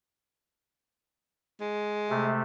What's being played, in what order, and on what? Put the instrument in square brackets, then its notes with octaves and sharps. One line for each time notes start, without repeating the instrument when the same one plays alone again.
[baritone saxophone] G#3
[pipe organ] C3 A3